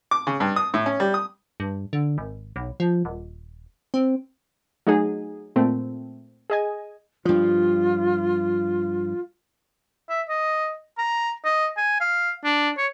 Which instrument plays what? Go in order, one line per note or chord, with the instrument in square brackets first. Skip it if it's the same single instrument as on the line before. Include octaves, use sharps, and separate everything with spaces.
[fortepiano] D6
C#3
G2
D#6
A2
C#4
G3
D#6
[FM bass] G2
D3
G#1
B1
F3
D#1
C4
[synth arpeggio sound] F#3 A3 D#4 F#4 G#4
A#2 A3 C4
G#4 D#5 G#5
[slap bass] G2 F3 [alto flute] F4
[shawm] E5
D#5
A#5
D#5
G#5
F5
D4
C#5